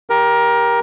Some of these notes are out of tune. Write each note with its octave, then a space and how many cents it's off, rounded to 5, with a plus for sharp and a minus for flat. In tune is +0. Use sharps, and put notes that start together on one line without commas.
G4 +0 A#4 +20